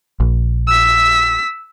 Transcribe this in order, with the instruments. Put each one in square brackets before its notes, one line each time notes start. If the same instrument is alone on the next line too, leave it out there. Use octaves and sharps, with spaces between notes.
[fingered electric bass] A#1
[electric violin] E6 B6